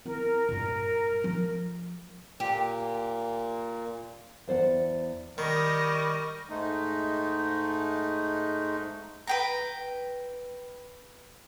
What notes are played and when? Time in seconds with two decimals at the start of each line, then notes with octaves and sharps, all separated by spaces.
0.06 C4 E4 A#4
0.49 G2 A#2
1.24 F3 A3
2.40 A#2 G4
4.47 E2 C5 D5 F#5
5.38 D#3 G3 A#4 D#5 C#6
6.50 G#2 G#3 A3 D#4
9.27 B4 G5 A#5